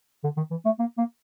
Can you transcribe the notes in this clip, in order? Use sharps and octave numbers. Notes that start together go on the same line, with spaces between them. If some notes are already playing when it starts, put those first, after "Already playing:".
D3
D#3
E3
A3
A#3
A#3